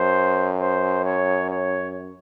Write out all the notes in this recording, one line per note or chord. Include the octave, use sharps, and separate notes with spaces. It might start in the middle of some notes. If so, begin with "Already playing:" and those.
Already playing: F#2 C5
C5
C#5
C#5